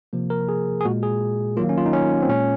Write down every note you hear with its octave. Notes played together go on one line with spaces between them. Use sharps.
C3 F3 A#3
A#4
G#4
G#4
A#2 G#3 F#4
G#4
D#3 F#3 A#3 F4
C#4
F4
D#4
C#4
C4
A#2 G#3 C#4